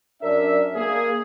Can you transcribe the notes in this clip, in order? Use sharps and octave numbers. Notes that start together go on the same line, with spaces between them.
F#2 D4 A#4 D5 E5
A#3 G#4